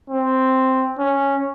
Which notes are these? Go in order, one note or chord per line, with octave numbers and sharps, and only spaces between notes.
C4
C#4